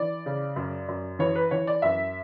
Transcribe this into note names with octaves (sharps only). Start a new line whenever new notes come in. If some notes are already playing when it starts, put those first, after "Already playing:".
Already playing: E3 D5
C#3
F#2
F#2
E3 C#5
B4
E3 C#5
D5
F#2 E5